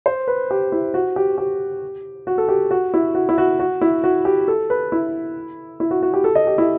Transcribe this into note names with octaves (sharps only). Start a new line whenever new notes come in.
C5
B4
G4
E4
F#4
G4
G4
F#4
A4
G4
F#4
E4
F#4
E4
F#4
F#4
E4
F#4
G4
A4
B4
E4
E4
F#4
F#4
G4
A4
D#5
G4
E4